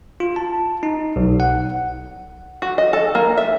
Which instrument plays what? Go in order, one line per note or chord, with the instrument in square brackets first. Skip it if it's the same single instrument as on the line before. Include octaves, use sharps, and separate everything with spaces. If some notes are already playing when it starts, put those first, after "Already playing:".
[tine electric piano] F4
A5
D#4
B1
F#5
[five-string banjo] F#4
D#5
A4
A#3
E5